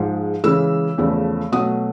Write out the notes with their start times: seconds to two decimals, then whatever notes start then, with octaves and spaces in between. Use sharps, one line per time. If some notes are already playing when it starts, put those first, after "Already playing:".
Already playing: G#2 F3 G#3
0.44 C#3 E3 G#3 E6
0.98 E2 C#3 F3 A3
1.52 B2 F#3 A3 D#6